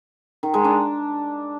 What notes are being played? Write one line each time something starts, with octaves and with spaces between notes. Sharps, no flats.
D#3
G#3
D4